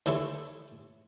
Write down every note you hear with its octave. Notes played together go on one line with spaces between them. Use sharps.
D#2 E3 A4 C#5 C6